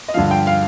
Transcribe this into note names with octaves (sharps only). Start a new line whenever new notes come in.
D#5
G2 D3 F3 F5
G5
F5